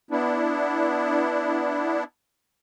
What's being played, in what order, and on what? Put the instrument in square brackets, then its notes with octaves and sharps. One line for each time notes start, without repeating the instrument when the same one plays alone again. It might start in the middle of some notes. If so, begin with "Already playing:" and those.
[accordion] B3 D4 E4